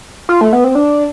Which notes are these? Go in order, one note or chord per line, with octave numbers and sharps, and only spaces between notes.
F4
A3
B3
C4
D4